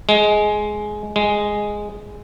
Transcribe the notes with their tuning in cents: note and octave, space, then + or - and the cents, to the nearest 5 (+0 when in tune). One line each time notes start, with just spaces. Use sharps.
G#3 +15
G#3 +0